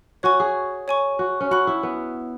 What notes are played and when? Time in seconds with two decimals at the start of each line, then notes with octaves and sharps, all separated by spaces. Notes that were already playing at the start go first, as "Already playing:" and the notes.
0.23 F#4 C#5 G#5 C#6
0.40 G#4
0.88 C#5 G#5 C#6
1.19 F#4
1.40 C#4
1.51 F#4 F#5 B5 F#6
1.67 E4
1.83 B3